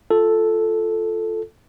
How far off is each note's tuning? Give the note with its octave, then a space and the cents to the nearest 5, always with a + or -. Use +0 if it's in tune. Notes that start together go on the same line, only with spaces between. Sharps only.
F4 +0 A4 +0